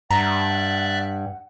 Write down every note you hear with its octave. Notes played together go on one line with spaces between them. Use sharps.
G2 D5 E5 F#5 A#5 F#6